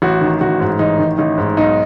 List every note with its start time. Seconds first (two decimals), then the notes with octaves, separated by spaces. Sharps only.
0.02 A1 F#4
0.21 D#3
0.41 A1 F#4
0.60 G#2
0.79 A1 D#4
0.99 D#3
1.18 A1 D#4
1.38 G#2
1.57 B1 D#4